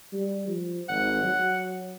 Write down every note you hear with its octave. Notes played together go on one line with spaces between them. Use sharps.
G3
F3
G#1 F#5
F#3